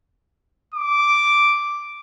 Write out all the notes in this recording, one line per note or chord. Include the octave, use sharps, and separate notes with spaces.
D6